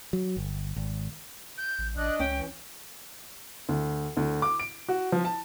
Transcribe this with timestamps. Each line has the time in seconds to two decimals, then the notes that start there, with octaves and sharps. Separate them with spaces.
0.13 F#3
0.37 G1
0.76 G#1
1.58 G6
1.79 A1
1.96 A1 D4 D5 D#5 F#6
2.19 C#2 C#4 G5
2.35 E3
3.69 D2
4.17 D2
4.42 D6
4.60 D7
4.89 F#4
5.12 F3
5.25 A5